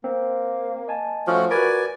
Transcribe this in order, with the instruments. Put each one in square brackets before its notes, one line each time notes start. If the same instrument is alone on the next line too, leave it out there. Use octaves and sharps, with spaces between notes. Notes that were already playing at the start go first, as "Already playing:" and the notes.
[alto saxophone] A#3 [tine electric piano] C4
[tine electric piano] D#5 G#5 A5
[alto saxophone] F3 [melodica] A3 C#4 F#4
[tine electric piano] F#4 B4 B5 [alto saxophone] A#4 [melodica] D5 G#5